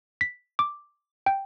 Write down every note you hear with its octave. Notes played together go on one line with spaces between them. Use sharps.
B6
D6
G5